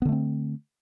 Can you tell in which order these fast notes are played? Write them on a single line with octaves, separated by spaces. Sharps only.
B3 D3 A3 C4